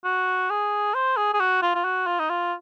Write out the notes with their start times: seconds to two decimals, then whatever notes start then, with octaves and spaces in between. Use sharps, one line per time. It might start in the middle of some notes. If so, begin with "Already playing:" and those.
0.05 F#4
0.50 G#4
0.94 C5
1.17 G#4
1.34 G#4
1.40 F#4
1.63 F4
1.75 F4
1.85 F#4
2.07 F4
2.20 D#4
2.30 F4